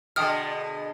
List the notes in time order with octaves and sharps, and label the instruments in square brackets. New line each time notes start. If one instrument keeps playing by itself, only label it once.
[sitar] B2 D3 G#3 [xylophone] G5 D#6 F6